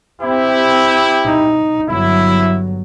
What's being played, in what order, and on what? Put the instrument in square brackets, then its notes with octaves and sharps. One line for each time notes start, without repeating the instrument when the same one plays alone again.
[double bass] C4 [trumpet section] E4 G4
[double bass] D#4
[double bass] G1 F#3 [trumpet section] E4